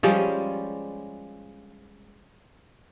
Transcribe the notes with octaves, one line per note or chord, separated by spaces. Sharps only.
F3 G3 G#3 C#4